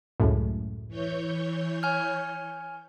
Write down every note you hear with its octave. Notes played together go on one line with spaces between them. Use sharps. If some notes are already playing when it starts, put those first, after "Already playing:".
C#2 F#2 A2
E3 C#5 G6
G#5 F6